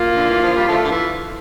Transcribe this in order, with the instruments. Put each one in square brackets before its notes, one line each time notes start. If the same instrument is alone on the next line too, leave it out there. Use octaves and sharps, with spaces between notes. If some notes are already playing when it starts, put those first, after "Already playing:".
Already playing: [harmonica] A#3 [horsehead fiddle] F4
[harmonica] D3
E3
F3
G3
D3 F3 A3
D3
E3